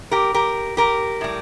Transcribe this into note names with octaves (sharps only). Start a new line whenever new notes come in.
G4 A#4
G4 A#4
G4 A#4
A2 G3